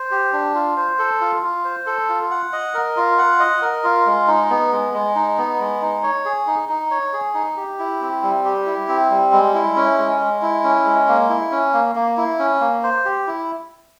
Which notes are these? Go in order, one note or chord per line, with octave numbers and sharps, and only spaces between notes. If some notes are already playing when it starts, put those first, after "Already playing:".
Already playing: C5
G4
D4
F4
C5
A4
F4
F4
C5
A4
F4
F#5
D#5
A#4
F4
F#5
D#5
A#4
F4
G#3
D#4
B3
G#3
G#3
D#4
B3
G#3
D#4
C#5
G#4
D#4
D#4
C#5
G#4
D#4
G4
E4
C4
G3
G4
E4
C4
G3
G#3
E4
C#4
G#3
G#3
E4
C#4
G#3
A#3
E4
C#4
A#3
A#3
E4
C#4
A#3
C5
G4
E4